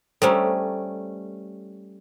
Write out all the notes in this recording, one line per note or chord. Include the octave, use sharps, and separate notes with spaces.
G3 A3 C#4 A4 C5 A#5